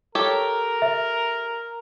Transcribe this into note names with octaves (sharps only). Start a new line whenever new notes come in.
G4 A4 A#4 C#5
E5